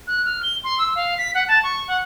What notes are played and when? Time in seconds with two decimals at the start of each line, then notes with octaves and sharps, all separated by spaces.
0.07 F#6
0.25 F6
0.43 G7
0.64 C6
0.79 E6
0.96 F5
1.18 B6
1.35 F#5
1.48 A5
1.63 C#6
1.88 F#5